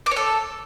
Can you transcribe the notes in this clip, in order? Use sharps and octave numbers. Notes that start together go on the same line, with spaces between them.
D6
C#5
A4